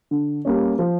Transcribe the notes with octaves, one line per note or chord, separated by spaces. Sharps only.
D3
G3 A#3 C#4
F3